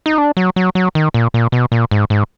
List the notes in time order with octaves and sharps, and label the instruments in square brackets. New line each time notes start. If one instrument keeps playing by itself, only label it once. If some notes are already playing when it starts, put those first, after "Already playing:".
[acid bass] D#4
D4
F#3
F#3
F#3
D#3
A#2
A#2
B2
A#2
G#2
G#2